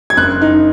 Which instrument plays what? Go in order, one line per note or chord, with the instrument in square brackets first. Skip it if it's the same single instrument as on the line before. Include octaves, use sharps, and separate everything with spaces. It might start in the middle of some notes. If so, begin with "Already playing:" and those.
[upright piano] G#6
F#1 F#6
D#4